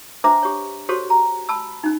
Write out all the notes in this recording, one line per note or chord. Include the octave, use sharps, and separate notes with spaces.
D4 B4 C5 E5 A#5 D6
G4 C#5
F#4 G4 A4 C5 C#5
A#5
A5 B5 E6
C#4 D#4